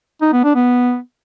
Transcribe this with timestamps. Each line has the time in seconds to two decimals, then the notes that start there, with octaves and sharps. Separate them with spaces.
0.22 D#4
0.33 B3
0.44 D4
0.55 B3